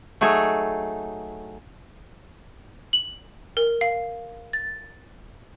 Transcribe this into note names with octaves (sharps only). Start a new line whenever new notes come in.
F#3 A3 D#4 G#4 A4
F#7
A#4
F5
A6